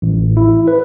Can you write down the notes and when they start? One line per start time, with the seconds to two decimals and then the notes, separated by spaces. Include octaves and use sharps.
0.02 A1
0.37 E4
0.68 B4